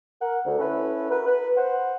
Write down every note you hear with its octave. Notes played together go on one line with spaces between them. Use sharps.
A#4 F#5
D2
C#4 E4 A4 B4
F#4 A#4 B4
B4
C5 F#5